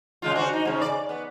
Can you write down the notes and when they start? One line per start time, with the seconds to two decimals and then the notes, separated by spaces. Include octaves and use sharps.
0.22 C#3 G#3 F4
0.35 D4 F#4 C5
0.53 D#4
0.65 G#2 C#3
0.81 D5
1.09 B3